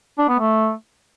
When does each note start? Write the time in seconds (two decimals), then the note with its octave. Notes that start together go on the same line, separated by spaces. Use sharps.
0.18 D4
0.29 B3
0.39 A3